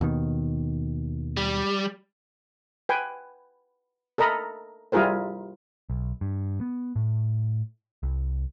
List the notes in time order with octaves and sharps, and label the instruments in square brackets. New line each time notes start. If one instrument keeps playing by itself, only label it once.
[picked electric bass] D#2 B2 D#3
[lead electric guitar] G3
[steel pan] B4 G5 G#5
A4 A#4 D#5 A#5 B5
G3 E4 F4 G#4 A#4 C5
[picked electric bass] B1
G2
B3
A2
C2